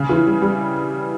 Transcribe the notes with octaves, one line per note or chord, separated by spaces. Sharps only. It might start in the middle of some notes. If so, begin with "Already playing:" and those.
Already playing: C#3
E3
G3
G3